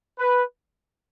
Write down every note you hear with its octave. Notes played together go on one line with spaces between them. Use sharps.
B4